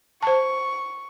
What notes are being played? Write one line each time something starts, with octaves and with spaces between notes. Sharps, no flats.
C5 A5 C#6